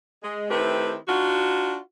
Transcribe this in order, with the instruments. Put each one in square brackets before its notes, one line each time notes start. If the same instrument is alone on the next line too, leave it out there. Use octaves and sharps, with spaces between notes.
[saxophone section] G#3
D#3 A3 C4 E4 G4 B4
D4 D#4 F4 F#4